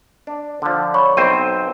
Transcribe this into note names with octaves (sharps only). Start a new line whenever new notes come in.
D4
D3 F3
C#5 B5 C#6
B1 C4 C5 D#7